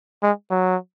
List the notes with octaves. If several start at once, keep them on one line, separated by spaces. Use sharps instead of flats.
G#3
F#3